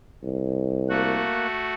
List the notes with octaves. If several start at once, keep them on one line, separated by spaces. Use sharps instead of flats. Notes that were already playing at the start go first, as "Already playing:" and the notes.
C2
A3 A#3 F#4 F#6